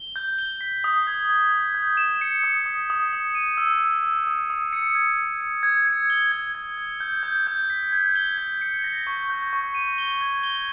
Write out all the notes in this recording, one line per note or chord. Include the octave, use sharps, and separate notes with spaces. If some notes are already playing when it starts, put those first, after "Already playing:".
Already playing: G7
G6
G7
B6
D#6
G#6
G#6
G6
G6
E7
C#7
D#6
D#6
D#6
D#6
D#7
E6
E6
E6
D#6
D#6
C#7
G#6
C#7
C#7
G#6
C#7
G7
G#6
G#6
G#6
G6
G6
G6
B6
G#6
G7
G#6
C#7
A#6
C#6
G6
C#6
D#7
G7
G#6
G7